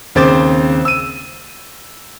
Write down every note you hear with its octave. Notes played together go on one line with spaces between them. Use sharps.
D#2 C#3 C4 C5 D6 A6
E6 D#7